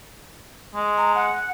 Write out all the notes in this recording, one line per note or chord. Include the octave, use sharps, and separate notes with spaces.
G#3
A#5
F#5